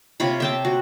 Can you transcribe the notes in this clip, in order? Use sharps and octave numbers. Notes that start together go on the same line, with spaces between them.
C3 F4 C#5 B5
E5 G5 A5
F#4